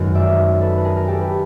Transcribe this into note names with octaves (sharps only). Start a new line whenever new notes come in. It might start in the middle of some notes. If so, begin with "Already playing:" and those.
Already playing: F#2 D#3 G#3 B3
D5 E5
A4 B4
B4
G#4 A#4
A#4
G4 A4
B4